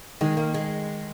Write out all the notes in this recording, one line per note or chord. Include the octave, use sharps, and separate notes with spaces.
D#3 G#3
A#3
G#3